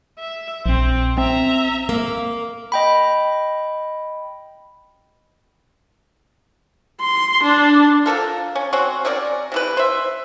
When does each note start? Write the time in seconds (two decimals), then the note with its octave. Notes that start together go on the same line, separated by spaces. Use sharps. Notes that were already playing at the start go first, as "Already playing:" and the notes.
0.19 E5
0.66 A#1 C4
1.18 C4 E5 A#5
1.89 A#3
2.72 D#5 G5 B5
7.02 C6
7.43 D4
8.06 F3 B3 A4 A#4
8.55 C#4
8.73 C4 C#4 F#4
9.05 C4 C#4 A#4 D5
9.52 C3 E3 B4
9.77 C5 E5